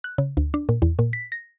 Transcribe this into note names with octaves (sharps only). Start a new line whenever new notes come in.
F#6
C#3
D2
D4
A#2
E2
A#2
B6
A#6